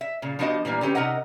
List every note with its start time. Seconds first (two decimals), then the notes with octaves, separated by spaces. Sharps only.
0.01 E5
0.22 A#2 C#3
0.39 F3 B3 D4 F#4 G4 D#5
0.65 A#2 E3 G3 A#3
0.81 D3 C4 C#4 G4 B4
0.95 C3 C#4 D#4 A#4 D#5 F#5